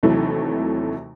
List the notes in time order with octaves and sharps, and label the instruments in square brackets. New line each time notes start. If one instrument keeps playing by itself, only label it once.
[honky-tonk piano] D#2 C3 E3 F#3 A3